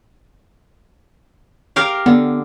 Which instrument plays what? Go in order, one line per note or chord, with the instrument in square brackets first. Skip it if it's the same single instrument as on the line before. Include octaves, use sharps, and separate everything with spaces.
[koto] G4 A#4 F5
[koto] D3 [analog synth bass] B3